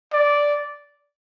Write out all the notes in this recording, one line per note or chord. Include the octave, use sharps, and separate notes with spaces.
D5